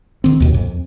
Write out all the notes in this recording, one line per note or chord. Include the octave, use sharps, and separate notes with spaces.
D#3 C4
D#2 B2
F2